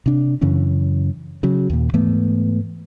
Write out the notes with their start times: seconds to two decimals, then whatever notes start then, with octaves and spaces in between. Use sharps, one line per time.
0.06 C3 D4
0.41 F#2 C#3 E3 C#4
1.43 C#3 F#3
1.70 D#2 A#2
1.94 G#2 E3 A3 B3